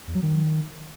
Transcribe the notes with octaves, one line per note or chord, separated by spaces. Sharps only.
E2
F#3
D#3